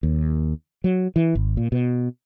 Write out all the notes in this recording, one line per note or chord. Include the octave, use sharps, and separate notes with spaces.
D#2
F#3
E3
G#1
A#2
B2